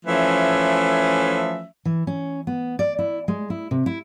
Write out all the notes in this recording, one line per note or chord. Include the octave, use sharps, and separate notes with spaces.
E3 F3 A3 C#4 E5
E3
C#4
B3
D5
E4
G#3
E4
C3
E4